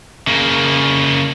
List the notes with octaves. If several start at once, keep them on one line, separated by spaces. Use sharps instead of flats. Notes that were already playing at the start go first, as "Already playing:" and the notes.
C#3 A#3